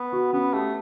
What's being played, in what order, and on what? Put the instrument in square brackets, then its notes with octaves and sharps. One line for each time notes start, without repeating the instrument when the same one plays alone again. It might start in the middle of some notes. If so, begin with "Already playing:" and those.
Already playing: [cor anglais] B3
[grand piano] F#4
[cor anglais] B3 [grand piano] C#4
[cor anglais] A3 [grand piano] G4